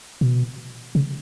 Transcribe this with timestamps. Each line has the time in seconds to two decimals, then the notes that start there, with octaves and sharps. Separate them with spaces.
0.21 B2
0.95 C#3